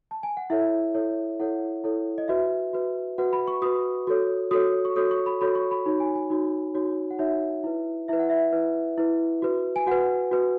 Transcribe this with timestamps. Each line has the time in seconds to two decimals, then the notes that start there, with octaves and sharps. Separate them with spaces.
0.11 A5
0.23 G#5
0.37 F#5
0.50 E4 A4 C#5 E5
0.94 E4 A4 C#5
1.39 E4 A4 C#5 F#5
1.84 E4 A4 C#5
2.18 D#5
2.28 F#4 B4 E5
2.73 F#4 B4
3.18 F#4 B4 F#5
3.33 B5
3.47 C#6
3.62 F#4 B4 D#6
4.07 F#4 A4 C#5
4.51 F#4 A4 C#5 D#6
4.85 C#6
4.96 F#4 A4 C#5 D#6
5.11 C#6
5.26 B5
5.41 F#4 A4 C#5 B5
5.55 C#6
5.71 B5
5.86 D#4 F#4 C#5 B5
6.00 G#5
6.15 G#5
6.30 D#4 F#4 C#5
6.74 D#4 F#4 C#5
7.11 F#5
7.19 D#4 F#4 C#5 E5
7.64 E4 B4
8.08 E4 B4 E5
8.19 F#5
8.30 E5
8.53 E4 B4
8.98 E4 B4
9.42 F#4 B4
9.76 G#5
9.87 F#4 B4 F#5
10.31 F#4 B4